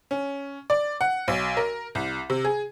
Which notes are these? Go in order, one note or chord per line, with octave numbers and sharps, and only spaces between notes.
C#4
D5
F#5
B1
A#4
C2
C3
G#4